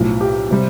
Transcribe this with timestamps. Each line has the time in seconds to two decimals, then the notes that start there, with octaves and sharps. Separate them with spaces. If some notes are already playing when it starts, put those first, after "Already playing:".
Already playing: B1 A2 F3
0.21 G4
0.51 C3 G3 C4